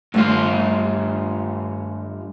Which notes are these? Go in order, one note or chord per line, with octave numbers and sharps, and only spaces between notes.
G2 A3 F4 E5 F5